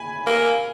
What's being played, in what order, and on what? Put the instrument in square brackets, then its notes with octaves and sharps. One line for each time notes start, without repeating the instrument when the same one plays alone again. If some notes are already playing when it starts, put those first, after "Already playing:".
Already playing: [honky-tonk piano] G#5 B5
[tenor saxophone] A#3